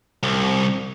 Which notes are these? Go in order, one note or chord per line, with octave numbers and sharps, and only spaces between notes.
C2